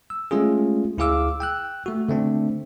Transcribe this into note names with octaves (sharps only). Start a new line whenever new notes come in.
E6
G#3 A3 C#4 F4 G#4
D2 E4 G#4 F5 D6 E6
G5 E6 F#6
A3 F#4
D3 A3 C4 D4